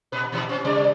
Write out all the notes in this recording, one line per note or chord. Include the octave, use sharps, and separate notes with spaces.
A#2 B4
A#2 E3 G3
B3 C#4
C3 G3 D5